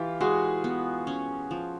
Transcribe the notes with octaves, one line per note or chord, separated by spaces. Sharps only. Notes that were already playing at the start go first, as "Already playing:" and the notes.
Already playing: E3 F4 G4
G#3 F#4 G#4
B3
C#4
F3